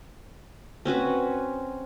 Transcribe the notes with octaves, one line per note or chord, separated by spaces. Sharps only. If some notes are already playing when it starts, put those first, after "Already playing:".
C4 C#4 F#4 B4